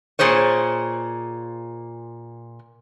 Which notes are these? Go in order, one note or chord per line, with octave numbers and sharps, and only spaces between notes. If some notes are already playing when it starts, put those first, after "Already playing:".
A#2 G#4 C5 C#5